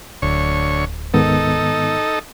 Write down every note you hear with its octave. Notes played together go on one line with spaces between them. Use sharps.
D1 D2 C#5
G#2 D#3 B3 D#4 A4